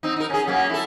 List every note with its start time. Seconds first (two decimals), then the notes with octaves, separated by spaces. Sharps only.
0.03 C4 D#4
0.16 D#4 A#4
0.30 C#4 G#4
0.47 F#3 A#3 C#4
0.70 E4 A4